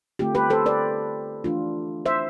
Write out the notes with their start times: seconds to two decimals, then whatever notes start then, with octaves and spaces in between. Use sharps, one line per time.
0.19 D3 A3 C4 F4 G4
0.35 G4 B4
0.50 A4 C5
0.66 B4 D5
1.44 E3 A3 D4 F4
2.06 C5 E5